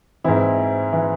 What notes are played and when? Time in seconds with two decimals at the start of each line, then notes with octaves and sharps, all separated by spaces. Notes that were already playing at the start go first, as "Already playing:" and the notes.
0.24 G#2 E3 C4 E4
0.93 E3